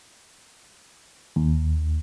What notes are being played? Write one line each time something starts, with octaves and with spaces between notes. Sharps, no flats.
D#2